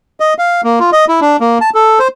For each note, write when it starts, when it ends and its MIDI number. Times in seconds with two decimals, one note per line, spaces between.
0.20 0.34 75
0.38 0.61 77
0.64 0.79 58
0.80 0.90 65
0.92 1.05 75
1.08 1.20 64
1.21 1.37 62
1.40 1.58 58
1.61 1.70 81
1.74 1.99 69
1.99 2.08 72